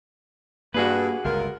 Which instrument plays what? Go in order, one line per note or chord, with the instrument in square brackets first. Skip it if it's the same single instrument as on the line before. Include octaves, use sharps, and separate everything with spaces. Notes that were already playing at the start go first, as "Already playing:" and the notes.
[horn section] G2 [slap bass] A#3 [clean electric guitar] F#4 G#4 B4
[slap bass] G1 C#2 [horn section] F4 A#4